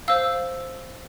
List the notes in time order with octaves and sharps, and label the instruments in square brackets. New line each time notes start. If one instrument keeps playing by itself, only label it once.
[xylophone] C5 F5 E6